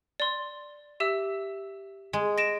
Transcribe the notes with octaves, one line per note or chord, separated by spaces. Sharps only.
D5 C6
G4 E5 E6
G#3
A#6 D7 E7